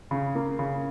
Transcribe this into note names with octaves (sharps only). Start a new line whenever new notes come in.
C#3
A#3
C#3